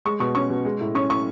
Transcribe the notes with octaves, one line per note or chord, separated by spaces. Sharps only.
G#3 C#6
B2 C#6
C#4 C#6
B2
G#3
A2
C#4 C#6
A2 C#6